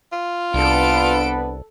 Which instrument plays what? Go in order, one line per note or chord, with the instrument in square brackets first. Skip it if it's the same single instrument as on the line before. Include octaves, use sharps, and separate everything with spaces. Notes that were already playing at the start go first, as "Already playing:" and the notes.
[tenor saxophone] F4
[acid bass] C2 [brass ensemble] B3 D4 B4 [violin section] A4 D7